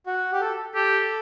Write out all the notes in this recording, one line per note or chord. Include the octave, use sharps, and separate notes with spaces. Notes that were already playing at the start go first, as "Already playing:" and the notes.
F#4
G4
A4
G4 A4